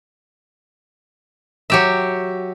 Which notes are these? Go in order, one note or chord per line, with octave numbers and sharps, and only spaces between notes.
F#3 G4 E5